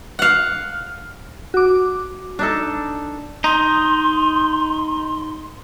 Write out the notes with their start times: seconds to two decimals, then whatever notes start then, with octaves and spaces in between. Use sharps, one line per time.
0.19 F5 F#5
1.54 F#4 D6
2.39 D4 D#4 A4
3.44 D#4 C6